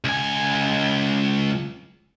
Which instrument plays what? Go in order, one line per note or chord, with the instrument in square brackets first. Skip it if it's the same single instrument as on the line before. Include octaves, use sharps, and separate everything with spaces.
[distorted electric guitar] C#2 G#5